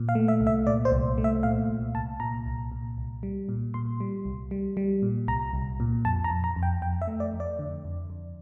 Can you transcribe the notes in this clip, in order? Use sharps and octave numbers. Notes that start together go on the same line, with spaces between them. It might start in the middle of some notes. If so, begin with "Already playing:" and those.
Already playing: A#2
F5
A3
E5
C2
E5
A#2 D5
C5
C2
A3
E5
A#2 F5
C2
C2 A5
A#2 A#5
C2
A#2
C2
G3
A#2
A#2 C6
G3
C2
G3
G3
A#2
C2 A#5
C2
A#2
F2 A5
A#5
F2
A#5
F2
G5
F2 G5
E5
A3
D5
F2
D5
D3
F2
F2